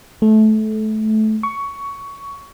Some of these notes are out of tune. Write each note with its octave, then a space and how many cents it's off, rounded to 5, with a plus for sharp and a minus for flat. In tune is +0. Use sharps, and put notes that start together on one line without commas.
A3 -20
C#6 +15